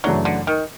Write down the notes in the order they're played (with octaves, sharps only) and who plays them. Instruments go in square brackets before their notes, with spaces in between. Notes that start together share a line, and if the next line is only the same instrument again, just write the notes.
[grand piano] F#2 C#3 E3 A3 D4 [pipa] F#3
[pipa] D3
D#3